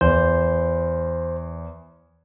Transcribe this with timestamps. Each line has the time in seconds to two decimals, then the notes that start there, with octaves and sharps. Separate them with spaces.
0.01 E2 C5